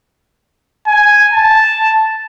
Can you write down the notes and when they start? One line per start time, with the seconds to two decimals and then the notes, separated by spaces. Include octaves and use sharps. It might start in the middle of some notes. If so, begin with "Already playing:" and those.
0.87 G#5
1.32 A5